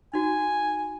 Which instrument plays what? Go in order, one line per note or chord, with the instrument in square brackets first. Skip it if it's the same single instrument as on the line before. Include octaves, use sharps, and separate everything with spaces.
[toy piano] D#4 F#4 [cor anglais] G#5